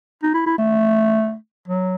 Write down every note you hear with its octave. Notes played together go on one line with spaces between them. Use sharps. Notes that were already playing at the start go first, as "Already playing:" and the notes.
D#4
E4
E4
A3
F#3